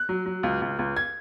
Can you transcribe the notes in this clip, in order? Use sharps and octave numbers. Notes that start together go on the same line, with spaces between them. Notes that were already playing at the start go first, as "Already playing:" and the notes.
Already playing: F#6
F#3
F#3
C#2
C#2
C#2
G#6